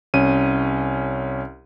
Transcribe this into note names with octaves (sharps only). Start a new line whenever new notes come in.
C2 C#4 D#7